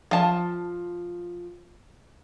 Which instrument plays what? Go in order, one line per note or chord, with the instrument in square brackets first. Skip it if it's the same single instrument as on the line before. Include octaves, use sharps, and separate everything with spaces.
[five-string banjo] F3 A5